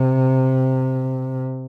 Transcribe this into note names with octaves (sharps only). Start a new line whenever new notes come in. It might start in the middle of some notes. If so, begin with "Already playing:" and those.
Already playing: C3